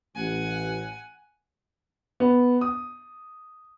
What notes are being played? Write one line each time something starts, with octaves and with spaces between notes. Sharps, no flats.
A1 F#5 G#5
B3
D#6